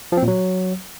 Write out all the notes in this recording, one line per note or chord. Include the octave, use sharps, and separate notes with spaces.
F3
C4
A#2
F#3